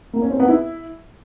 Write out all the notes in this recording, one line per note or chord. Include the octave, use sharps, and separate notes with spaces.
A#3
C#4
C4
B3
E4